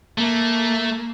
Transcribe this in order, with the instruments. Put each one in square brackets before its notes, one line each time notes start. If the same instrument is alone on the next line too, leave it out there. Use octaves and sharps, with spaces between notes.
[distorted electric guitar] A3 [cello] A#3